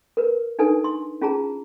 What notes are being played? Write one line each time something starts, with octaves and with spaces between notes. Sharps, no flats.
A#4 B4
D4 D#4 A4 B4 G#5
C6
C#4 F4 G#4 A5 A#5